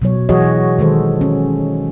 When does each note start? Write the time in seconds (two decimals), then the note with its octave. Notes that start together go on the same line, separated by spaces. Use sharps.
0.02 B2 F#3 C#5
0.29 E3 F#3 F#4 G#4 C#5 D#5
0.79 D#3 G#3 A4 C5
1.21 C#4